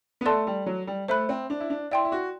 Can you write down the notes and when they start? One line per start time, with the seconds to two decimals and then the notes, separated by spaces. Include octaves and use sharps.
0.21 B3
0.26 A3 A4 D5 A5 C6
0.47 G3
0.66 F#3
0.87 G3
1.08 A3 C5 E5 B5 F#6
1.29 C4
1.50 D4
1.60 E4
1.70 D4
1.91 E4 D5 G5 C6
2.05 E4
2.12 F#4